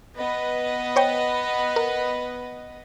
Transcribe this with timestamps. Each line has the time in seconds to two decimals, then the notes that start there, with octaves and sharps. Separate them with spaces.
0.16 B3 B4 D#5
0.96 C5 C#5 G5
1.76 A#4